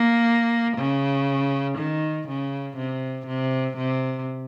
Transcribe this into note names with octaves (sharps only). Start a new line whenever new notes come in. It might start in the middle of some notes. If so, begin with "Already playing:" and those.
Already playing: A#3
C#3
D#3
C#3
C3
C3
C3